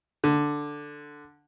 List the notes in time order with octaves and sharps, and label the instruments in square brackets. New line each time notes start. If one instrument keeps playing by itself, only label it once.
[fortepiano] D3